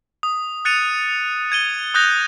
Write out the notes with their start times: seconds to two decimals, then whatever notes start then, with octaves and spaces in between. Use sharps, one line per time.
0.23 D#6
0.65 F#6 A6 C#7 D#7 F7
1.52 G#6 D#7 G7
1.94 D#6 F#6 G6 A#6 F7 G7